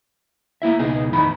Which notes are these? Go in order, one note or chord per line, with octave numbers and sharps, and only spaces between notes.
A#3 E4 E5
C#2 B2 D#4 G#4
E2 A2 D#3 D#4 B5